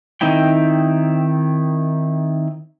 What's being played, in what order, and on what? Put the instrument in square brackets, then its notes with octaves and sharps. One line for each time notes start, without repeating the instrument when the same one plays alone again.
[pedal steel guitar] D#3 C4 D#4 E4 G5